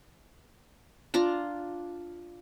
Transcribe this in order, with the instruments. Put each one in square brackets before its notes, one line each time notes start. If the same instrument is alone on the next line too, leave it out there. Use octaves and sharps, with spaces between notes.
[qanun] D4 F4 A#5